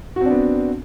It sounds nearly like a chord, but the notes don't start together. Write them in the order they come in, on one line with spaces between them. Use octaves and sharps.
F#4 C4 D4 B3